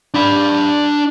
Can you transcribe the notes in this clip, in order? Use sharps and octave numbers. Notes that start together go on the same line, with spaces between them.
D4 B5